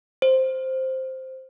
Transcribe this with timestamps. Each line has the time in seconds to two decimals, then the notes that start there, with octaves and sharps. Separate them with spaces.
0.22 C5